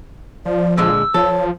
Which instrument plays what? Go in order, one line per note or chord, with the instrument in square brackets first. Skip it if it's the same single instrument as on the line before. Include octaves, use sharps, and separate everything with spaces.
[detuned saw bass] F3 [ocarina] D5
[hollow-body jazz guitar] A#2 D3 G#3 [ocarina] G#4 [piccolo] E6
[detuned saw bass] F3 [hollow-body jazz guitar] A4 [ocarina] C#5